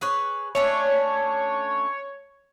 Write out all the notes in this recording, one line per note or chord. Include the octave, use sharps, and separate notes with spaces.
G#4 B4 C#5
A3 C#4 D4 C#5